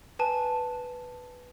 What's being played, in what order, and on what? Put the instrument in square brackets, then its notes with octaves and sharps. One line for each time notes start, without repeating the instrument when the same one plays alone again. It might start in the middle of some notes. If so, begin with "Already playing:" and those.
[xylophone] B4 G#5 A5